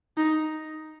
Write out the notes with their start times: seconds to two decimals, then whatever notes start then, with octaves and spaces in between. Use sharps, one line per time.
0.17 D#4